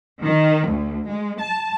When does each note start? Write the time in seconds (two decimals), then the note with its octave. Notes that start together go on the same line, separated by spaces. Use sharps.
0.22 D#3
0.68 D2
1.07 G#3
1.38 A5